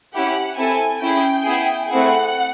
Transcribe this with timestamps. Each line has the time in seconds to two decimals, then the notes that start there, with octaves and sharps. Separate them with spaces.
0.13 C#4 E4 G4 F#5
0.57 C4 E4 A4 G#5
1.02 C#4 E4 G#4 G5
1.45 B3 E4 G#4
1.89 A3 C4 E4 G#4 F#5